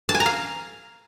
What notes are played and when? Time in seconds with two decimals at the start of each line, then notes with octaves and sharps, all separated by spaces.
0.09 A5
0.15 G#5
0.20 A#5
0.26 F5